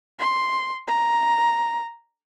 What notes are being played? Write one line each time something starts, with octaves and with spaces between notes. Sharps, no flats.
C6
A#5